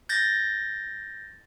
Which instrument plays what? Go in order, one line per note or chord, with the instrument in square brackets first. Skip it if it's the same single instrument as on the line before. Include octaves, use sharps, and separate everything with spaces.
[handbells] G6 A6 A#6